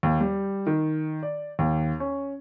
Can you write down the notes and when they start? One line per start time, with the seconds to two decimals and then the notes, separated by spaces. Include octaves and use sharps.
0.03 D#2
0.21 G3
0.67 D#3
1.23 D5
1.59 D#2
2.00 C#4